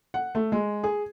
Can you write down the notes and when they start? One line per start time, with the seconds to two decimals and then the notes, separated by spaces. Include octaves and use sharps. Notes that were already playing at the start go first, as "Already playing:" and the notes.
0.14 F#5
0.35 A3
0.52 G#3
0.84 G#4